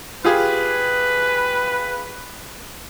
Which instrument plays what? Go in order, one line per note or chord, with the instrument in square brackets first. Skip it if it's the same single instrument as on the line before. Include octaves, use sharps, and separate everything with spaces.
[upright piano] F4 G4 G#4 [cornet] B4